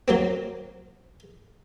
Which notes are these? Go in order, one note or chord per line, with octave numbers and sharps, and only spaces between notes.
F#3 A#3 C4